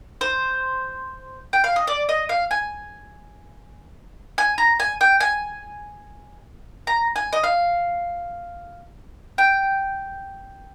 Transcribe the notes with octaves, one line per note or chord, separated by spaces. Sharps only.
C5
G5
F5
D#5
D5
D#5
F5
G#5
G#5
A#5
G#5
G5
G#5
A#5
G#5
D#5
F5
G5